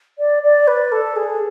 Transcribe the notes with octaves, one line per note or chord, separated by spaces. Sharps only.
D5
D5
B4
A4
G#4